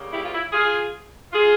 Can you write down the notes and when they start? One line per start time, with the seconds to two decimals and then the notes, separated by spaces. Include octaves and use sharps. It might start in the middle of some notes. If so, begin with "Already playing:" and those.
Already playing: C#3 G3 A#3
0.12 E4 G4
0.24 F4
0.33 E4
0.52 F4 G#4
1.33 F4 G#4